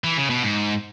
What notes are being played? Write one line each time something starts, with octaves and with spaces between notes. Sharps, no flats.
E3
C#3
B2
G#2